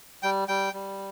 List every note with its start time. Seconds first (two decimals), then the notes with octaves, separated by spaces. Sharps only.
0.23 G3 G5
0.48 G3 G5
0.73 G3